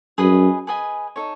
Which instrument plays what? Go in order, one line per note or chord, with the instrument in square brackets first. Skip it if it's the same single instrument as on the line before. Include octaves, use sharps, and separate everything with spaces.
[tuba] F#2 [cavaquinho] G#4 B4 D#5 G#5
[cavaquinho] G#4 B4 D#5 G#5
D#4 A4 C#5